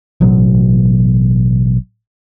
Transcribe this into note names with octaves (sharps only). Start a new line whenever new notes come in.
A1 B2 F#3